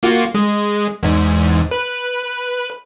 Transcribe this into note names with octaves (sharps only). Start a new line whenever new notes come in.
A#3 F4 F#4
G#3
E2 G#2
B4